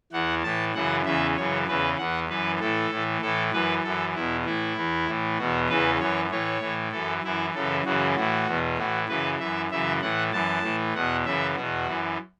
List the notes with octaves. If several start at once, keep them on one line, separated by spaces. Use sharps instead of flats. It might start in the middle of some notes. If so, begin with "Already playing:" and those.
E2 E3 F#5
A2 E3 A5
F#2 C#3 E3 F#5
E2 C#3 E3 E5
F#2 C#3 E3 C#5
E2 C#3 E3 B4
E2 E3 F#5
F#2 E3 B4
A2 E3 A4
A2 E3
A2 E3 A4
F#2 E3 B4
F#2 E3 A4
E2 B2 E4
A2 E3 E4
E2 E3
A2 E3
E2 B2 F#4
E2 C#3 E3 B4
F#2 E3 C#5
A2 E3 C#5
A2 E3
F#2 E3 A4
F#2 E3 E4
F#2 C#3 E3 A4
F#2 C#3 E3 F#4
A2 E3 F#4
E2 B2
A2 E3 F#4
F#2 C#3 E3 B4
F#2 E3 E5
F#2 C#3 E3 E5
A2 E3 F#5
F#2 E3 A5
A2 E3
E2 B2 F#5
F#2 C#3 E3 E5
B2 F#4
E2
F#2 E3